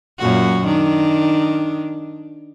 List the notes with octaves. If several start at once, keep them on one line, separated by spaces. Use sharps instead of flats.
F#2 A#2 F#4
D#3 D4